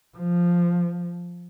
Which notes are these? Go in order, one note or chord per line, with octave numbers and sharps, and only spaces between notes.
F3